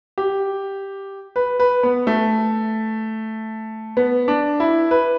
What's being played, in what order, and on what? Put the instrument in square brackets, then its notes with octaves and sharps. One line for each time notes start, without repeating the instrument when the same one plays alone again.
[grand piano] G4
B4
B4
B3
A3
B3
D4
E4
B4